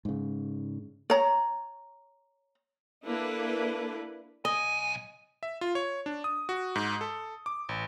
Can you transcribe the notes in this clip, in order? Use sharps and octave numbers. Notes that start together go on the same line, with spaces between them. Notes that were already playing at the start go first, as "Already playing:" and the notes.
G#2 C#3
C#5 A#5
A#3 D4 E4 A4 B4
B1 D#5 G#5
E5
F4
C#5
D4
D#6
F#4
G#2
A4
D6
A1